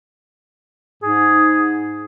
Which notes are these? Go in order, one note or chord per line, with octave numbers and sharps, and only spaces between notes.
G#2 G#4